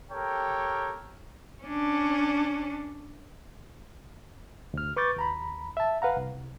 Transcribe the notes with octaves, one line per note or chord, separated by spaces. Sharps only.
G4 A4 A#4 C#5 G5
C#4 D4
D2 F6
B4 C#6 D6 G6 A6
D#2 A#5 B5
E5 A5
B4 F5 F#5 A#5
C2